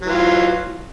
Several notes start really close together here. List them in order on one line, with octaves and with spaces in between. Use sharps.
F#3 E3 F4